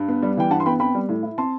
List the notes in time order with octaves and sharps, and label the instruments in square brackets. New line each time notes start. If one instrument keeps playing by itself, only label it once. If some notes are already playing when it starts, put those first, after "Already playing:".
Already playing: [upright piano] G2
B3
G3
E3 G5
G2 F#5 A5
C6
B3 G5 B5
C4 G5 B5
G3
A2
E4
C4 A5 C6